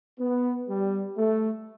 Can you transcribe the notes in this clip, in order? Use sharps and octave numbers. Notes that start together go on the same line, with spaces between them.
B3
G3
A3